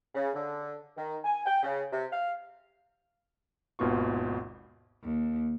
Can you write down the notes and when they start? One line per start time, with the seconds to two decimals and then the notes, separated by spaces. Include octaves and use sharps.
0.15 C#3
0.34 D3
0.96 D#3
1.24 G#5
1.46 G5
1.63 C#3
1.91 C3
2.12 F5
3.79 G#1 D#2 B2 B3 F4 C#6
5.02 D#2